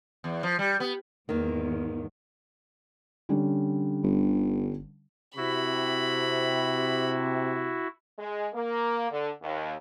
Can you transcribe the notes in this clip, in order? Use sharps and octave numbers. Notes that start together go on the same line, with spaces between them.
E2
F3
G3
B3
E2 G#2 D#3 A#3
D3 G3 C#4
G1
C3 E4 F#4 B5
G#3
A#3
D3
D#2